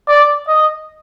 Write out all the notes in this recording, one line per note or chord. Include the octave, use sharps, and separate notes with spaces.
D5
D#5